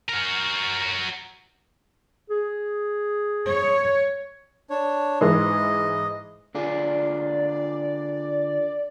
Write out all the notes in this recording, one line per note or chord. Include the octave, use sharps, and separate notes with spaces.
F#4 A#4
G#4
C#5
D4 C#5
G#2 E3 G#3 D#5
D3 F4 G#4 D5